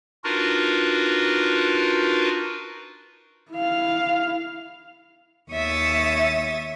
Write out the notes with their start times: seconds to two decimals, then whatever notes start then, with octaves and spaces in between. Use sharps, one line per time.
0.24 D4 D#4 F4 F#4 A#4 B4
3.52 E4 F5
5.52 D#2 C#5 E5 D#6 A6